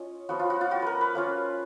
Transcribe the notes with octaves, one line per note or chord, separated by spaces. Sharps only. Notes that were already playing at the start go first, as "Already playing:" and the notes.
Already playing: C#4 F4 C#5 D#5
F3 B3 F4 F#4
F4
F#4
F4
F#4
A#4 B4
B4
A#3 C#4 F4